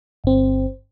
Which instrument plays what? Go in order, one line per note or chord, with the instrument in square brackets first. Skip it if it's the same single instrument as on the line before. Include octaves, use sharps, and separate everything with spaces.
[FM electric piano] G1 C4